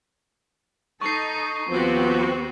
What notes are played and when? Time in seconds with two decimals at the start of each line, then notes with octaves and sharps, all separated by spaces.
1.01 D#4 A4 C#6 C7
1.69 D#2 F3 B3 C4 F#4 G4